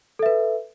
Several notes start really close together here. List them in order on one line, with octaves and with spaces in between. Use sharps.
A4 E5 B4